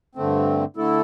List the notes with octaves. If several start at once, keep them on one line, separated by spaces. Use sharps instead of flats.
G2 D3 A3 C4
D3 A3 E4 A4